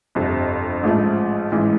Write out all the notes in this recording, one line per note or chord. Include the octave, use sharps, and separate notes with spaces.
G1 F2 C3
A1 G#2 F3 A3
A1 G#2 E3